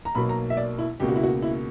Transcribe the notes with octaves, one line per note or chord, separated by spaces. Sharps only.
A#5
B1 B2 A#3 B5
A#5
E5
D5
E4
C#2 B2 A#3 G4
F#4
E4
F#4
E4